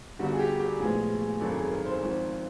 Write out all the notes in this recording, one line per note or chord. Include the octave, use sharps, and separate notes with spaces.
G1 G2 D3 G3 F#4
G#4
G4
G4
A#1 A2 F3 G#3 B3 G#4
G#1 F#2 D#3 F#3 A4
G#4
A#4
C5
G#1 G#2 F3